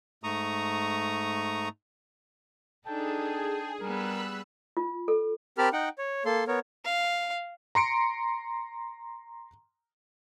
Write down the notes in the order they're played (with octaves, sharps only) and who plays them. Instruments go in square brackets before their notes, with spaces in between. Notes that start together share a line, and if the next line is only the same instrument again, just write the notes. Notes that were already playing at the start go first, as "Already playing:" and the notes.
[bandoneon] G#2 A3 A#5 C#6 D#6
[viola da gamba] D4 D#4 A4 [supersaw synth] G#4 [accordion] G5 A5
[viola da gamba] G3 B3 [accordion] A#4 [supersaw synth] B5 E6 F#6
[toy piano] F4
A4
[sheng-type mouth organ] C4 G4 A#4 A5 B5 F6
D#4 F#5 G5
C#5
A#3 A4 C6
B3 A#4 C#5
[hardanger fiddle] F5
[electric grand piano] A#5 C6 C#7 D7